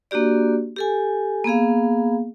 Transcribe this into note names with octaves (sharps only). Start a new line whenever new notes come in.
A#3 D4 F#4 G4 D5
G4 A4 G#5
A#3 B3 G#4 F5